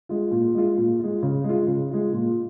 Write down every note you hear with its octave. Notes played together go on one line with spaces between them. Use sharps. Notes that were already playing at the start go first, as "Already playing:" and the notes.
G#3 F4
A#2
G#3 F4
A#2
G#3 F4
C#3
G#3
F4
C#3
G#3 F4
A#2